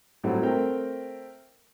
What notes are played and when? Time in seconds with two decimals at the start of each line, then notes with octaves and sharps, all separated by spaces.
0.24 A2 F#3 G3 C4 A4 F#5
0.43 A3 C4 A#4 G5